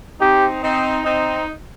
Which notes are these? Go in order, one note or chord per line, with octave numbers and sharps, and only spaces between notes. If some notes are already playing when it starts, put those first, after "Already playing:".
C4 D#4 G4
C4 D#4
C4 D#4